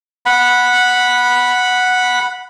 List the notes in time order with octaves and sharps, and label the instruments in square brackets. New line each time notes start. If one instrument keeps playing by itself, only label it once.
[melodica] F#5 B5